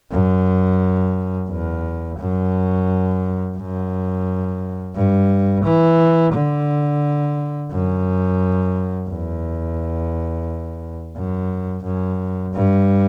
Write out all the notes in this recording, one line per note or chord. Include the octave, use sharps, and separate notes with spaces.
F#2
E2
F#2
F#2
G2
E3
D3
F#2
E2
F#2
F#2
G2